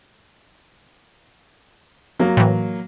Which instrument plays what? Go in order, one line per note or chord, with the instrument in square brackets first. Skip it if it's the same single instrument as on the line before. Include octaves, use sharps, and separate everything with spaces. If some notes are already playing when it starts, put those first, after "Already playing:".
[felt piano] F#3 A#3
[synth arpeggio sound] A2 E3